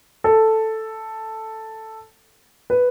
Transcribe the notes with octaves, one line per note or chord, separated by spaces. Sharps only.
A4
B4